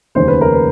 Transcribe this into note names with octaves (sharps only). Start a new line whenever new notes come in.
F1 D#2 C#3 C5
B4
A#4
B4